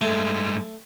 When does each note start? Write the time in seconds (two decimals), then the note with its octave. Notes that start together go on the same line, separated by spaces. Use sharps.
0.01 G2 G#3 A3